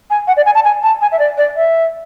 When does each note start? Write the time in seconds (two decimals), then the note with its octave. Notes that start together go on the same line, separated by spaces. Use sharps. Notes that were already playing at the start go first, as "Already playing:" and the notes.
0.10 G#5
0.27 F#5
0.37 D5
0.46 G#5
0.55 A5
0.64 G#5
0.83 A5
1.01 G#5
1.12 E5
1.19 D5
1.37 D5
1.56 E5